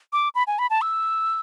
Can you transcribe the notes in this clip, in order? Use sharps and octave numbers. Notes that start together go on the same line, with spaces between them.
D6
B5
G#5
B5
A5
E6